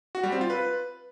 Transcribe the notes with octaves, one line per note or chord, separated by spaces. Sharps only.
F#4
G3
C4
F4
B4